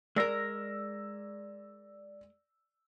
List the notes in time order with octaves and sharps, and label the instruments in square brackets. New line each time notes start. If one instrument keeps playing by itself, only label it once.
[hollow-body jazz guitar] G#3 A#4 [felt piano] D5 E6 A#6